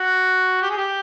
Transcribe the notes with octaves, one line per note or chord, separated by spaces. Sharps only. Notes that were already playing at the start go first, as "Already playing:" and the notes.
Already playing: F#4
G4
G#4
G4